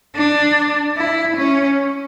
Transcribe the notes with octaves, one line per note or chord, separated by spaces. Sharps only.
D4
E4
C#4